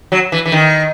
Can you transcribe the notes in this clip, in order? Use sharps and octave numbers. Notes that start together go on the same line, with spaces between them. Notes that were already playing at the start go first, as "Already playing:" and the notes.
F#3
E3
E3
D#3